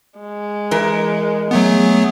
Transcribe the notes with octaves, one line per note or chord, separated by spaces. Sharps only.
G#3
E3 A#4
F#3 A3 B3 G#4